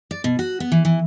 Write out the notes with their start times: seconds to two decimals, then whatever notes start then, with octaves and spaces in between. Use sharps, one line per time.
0.11 D5
0.24 B2
0.39 F#4
0.60 B3
0.72 E3
0.85 E3